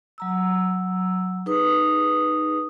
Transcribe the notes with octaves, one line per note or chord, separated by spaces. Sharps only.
F#3 A#5 E6
D#4 G#4 B4 D#6